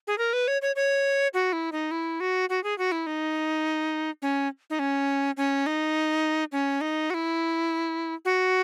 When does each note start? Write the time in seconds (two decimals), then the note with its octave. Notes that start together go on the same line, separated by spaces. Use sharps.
0.07 G#4
0.18 A#4
0.33 B4
0.48 C#5
0.62 C#5
0.76 C#5
1.34 F#4
1.53 E4
1.72 D#4
1.91 E4
2.20 F#4
2.49 F#4
2.64 G#4
2.78 F#4
2.92 E4
3.07 D#4
4.22 C#4
4.70 D#4
4.79 C#4
5.37 C#4
5.66 D#4
6.52 C#4
6.81 D#4
7.10 F#4
7.14 E4
8.25 F#4